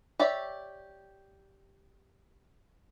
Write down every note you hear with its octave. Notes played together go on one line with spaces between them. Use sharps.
G4 C#5 D5 E5